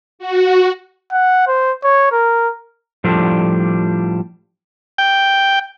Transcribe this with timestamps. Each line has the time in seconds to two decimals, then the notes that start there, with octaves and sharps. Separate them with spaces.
0.19 F#4
1.12 F#5
1.48 C5
1.83 C#5
2.12 A#4
3.04 A2 F3 G3 D4 F4 A4
4.98 G5